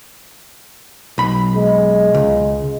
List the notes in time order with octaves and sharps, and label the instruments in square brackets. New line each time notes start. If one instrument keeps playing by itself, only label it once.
[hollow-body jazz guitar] B1 B5
[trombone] G#3
[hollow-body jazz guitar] C#2